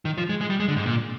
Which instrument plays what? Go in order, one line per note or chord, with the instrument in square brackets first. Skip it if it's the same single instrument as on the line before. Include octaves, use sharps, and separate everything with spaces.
[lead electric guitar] D#3
F3
G#3
G#3
G3
G#3
D3
G#2
A#2